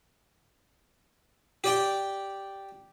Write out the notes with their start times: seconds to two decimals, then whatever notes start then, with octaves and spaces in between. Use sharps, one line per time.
1.64 G4 D5 G5